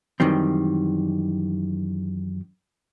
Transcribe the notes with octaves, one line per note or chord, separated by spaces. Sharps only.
F#2 D#3 E3 G3 C4